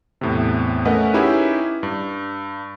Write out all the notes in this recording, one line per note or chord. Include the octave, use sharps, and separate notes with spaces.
E2 A2 C3
A3 C#4 A#4 B4 D#5 F#5
C#4 D#4 E4 G4 G#4 B4
G2